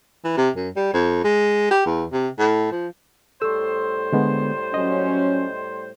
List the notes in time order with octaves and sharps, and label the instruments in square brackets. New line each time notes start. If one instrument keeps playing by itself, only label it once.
[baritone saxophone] E3
C3
F#2
G3
F2
G#3
G4
E2
C3
A2
F3
[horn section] A2 G3 C5 [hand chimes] A4 C#6 [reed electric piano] E6
[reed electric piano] D3 G#3 B3
[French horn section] F#3 C#4 [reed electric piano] D#5